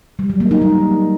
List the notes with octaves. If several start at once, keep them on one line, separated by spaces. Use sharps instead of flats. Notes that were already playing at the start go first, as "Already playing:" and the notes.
G3
F#3
A#3
D#4
G3